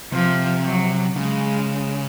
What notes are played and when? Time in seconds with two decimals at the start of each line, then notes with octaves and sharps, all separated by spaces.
0.13 C3 F3
0.65 F#3
1.16 C#3 G#3